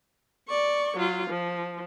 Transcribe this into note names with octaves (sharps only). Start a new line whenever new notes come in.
D5 C#6
F#3 F4
F3